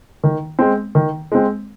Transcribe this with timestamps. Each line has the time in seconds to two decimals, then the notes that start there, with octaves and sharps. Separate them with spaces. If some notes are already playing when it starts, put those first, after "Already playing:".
0.24 D#3
0.59 G#3 C4
0.95 D#3
1.32 G#3 C4